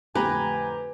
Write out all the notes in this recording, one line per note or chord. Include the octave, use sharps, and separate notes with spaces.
F2 A2 D3 G4 B4 G#5 A#5